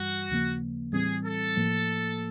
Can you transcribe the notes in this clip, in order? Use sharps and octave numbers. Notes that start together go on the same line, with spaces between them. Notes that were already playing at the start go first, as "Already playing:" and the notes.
Already playing: G2 E3 G3 F#4
D#2 C#3 F3 A#3
A2 E3 G3 C4 G#4
A4
A2 F3 A#3